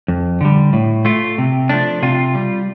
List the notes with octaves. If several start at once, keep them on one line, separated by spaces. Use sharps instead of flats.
F2
D3 G3
A2
A3 F4
C3
F3 A3 D4
C3 F4
G3